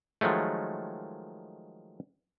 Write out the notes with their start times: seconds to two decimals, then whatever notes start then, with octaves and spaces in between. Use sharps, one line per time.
0.21 D#3 F3 F#3 G#3 A3